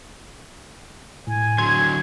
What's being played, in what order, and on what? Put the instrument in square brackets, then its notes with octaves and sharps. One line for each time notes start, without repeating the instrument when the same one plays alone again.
[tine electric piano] A2 [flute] G#5
[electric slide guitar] D3 F#3 [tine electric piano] C6 [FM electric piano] G#6